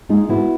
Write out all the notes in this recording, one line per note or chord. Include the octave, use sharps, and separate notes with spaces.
G#3 D#4 F4
B3 E4 F#4